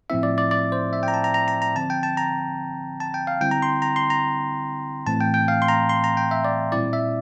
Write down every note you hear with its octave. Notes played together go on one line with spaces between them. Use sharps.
A2 F3 C4 E4 E5
D5
D5
D5
C5
E5
G5
A#5
A5
A#5
A#5
A#5
A#5
D3 F3 C4 A5
G5
A5
A#5
A5
G5
F5
D3 G3 C4 E4 G5
A#5
C6
A#5
C6
A#5
A2 E3 A3 C4 A5
G5
G5
F5
C6
A#5
C6
A#5
G5
E5
D5
A#2 G3 C4 E4 D5
E5